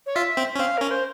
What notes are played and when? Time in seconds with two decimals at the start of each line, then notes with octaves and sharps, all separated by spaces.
0.06 C#5
0.16 F4 E5
0.37 C4
0.56 C#4
0.59 C4 F5
0.78 C#4 A#4
0.91 C5